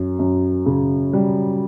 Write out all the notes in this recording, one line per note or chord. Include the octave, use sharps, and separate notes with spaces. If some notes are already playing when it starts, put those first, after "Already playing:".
Already playing: F#2
F#2
C#3
G3